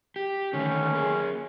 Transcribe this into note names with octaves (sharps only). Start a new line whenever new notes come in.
G4
D3 D#3 A3 C#4
A#3 G#4